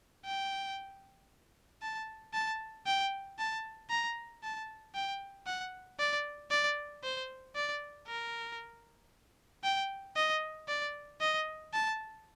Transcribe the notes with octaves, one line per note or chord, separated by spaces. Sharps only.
G5
A5
A5
G5
A5
A#5
A5
G5
F#5
D5
D5
C5
D5
A#4
G5
D#5
D5
D#5
A5